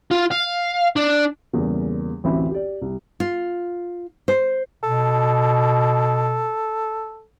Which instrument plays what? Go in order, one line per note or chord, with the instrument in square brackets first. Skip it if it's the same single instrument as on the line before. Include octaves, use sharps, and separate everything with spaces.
[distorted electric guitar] F4
F5
D4
[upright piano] E2 G2 C#3 A#3
A1 D2 E3 C4 E5 B5
G4 D5
C2
[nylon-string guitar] F4
C5
[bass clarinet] B2 [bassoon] A4